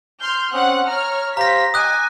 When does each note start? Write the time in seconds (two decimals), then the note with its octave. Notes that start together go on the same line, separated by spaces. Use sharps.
0.19 C6 F6 G6
0.53 C4 C#4 F#5 D#6 F#6
0.87 C#5 A#5 F6
1.37 G4 C5 F5 A#5 A#6 B6
1.74 D#5 G5 G#5 D6 D#6 F#6